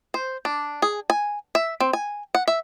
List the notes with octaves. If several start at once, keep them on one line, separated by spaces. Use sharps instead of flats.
C5
D4
G#4
G#5
E5
C4
G#5
F#5
E5